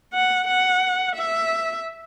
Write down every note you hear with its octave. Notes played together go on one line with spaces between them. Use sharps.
F#5
F#5
E5